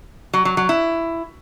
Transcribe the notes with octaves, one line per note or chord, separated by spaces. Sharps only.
F#3
F#3
F#3
E4